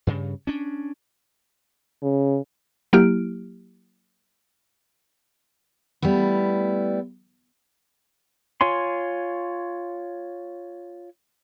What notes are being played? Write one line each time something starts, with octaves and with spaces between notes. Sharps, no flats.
G2 C#3
C#4 D4
C#3
F#3 A#3 E4 G4 F6 D7
G3 A3 B3 E4
F4 C#5 G#5 C6